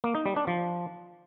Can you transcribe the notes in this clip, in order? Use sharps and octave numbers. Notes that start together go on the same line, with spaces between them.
A#3
D#4
G3
D4
F3